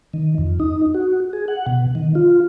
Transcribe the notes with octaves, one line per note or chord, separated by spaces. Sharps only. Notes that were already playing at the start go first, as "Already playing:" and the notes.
D#3
F2
D#4
F#4
G#4
F#5
B2
D#3
F4